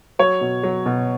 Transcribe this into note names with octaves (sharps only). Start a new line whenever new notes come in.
F#3 C#5
B2
F#3
B2